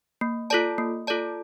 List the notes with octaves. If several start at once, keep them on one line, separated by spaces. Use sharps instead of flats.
A#3
F4 A4 D5 A5
A#3
F4 A4 D5 A5